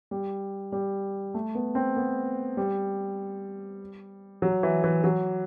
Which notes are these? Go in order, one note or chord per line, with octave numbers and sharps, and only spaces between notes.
G3
G3
A3
B3
C4
B3
G3
F#3
E3
E3
F#3